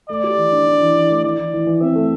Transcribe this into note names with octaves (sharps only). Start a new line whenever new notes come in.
A3 D5
G4
E3
D4
D4
E3
E3
A3
E3 D5
E3
E3
E3
C4 E5
A3